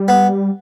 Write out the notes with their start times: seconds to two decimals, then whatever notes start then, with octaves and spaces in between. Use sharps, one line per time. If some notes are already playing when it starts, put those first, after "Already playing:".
Already playing: G3
0.08 B3